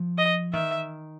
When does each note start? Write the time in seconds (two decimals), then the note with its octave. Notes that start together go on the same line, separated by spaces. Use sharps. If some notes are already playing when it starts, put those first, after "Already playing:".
Already playing: F3
0.18 D#5
0.53 D#3 E5